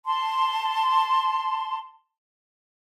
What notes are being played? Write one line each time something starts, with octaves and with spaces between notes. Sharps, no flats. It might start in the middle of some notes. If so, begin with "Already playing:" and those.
A5 C6